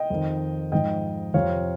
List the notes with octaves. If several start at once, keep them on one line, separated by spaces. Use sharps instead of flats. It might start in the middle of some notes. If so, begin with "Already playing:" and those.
Already playing: D#5 G5
F2 D#3
G#2 F3 D#5 G5
F2 C3 F3 C#5 F5